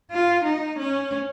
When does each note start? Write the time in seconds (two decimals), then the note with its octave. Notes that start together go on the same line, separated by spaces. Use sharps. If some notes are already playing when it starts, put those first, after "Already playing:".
0.11 F4
0.45 D#4
0.79 C#4